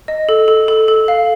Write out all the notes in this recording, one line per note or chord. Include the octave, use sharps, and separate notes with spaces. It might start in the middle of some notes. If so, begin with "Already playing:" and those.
D#5
A4
A4
A4
A4
F5